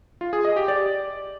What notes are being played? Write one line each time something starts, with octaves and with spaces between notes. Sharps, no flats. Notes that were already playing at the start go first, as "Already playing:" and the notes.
F4
G#4
D#5
G4
D5